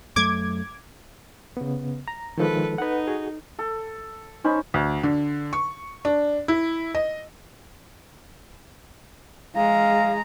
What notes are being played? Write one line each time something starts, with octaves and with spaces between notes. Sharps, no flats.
F#2 F#3 A3 D6 G#6
C#3 B3
A#5
D#3 F3 G#3 A4 B4
D#4 B4 F#5
F#4 G#4
A4
C#4 D#4 C5 B5
D2
D3
C#6
D4
E4
D#5
G#3 F5 A#5